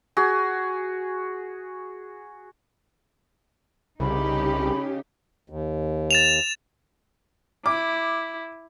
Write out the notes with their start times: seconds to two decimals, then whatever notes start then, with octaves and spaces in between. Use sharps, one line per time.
0.17 F#4 G#4
4.00 C2 C#3 D#4 G4 B5
5.50 D#2
6.11 A6 E7 F7
7.66 E4 D6